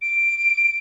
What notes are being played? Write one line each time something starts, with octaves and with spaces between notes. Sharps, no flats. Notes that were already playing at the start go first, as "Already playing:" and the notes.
D7